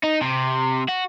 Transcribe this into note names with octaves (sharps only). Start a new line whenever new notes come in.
D#4
C3
F#4